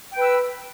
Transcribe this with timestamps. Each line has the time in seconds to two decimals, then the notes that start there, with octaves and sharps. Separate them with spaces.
0.12 G5
0.17 B4
0.22 E6